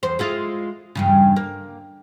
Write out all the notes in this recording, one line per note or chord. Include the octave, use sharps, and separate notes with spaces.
E2 C5
G#3 E4 F4
E2 G2 C#3
A#3